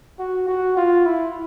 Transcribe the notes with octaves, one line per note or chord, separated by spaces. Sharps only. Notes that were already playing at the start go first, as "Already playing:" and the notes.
F#4
F#4
F4
E4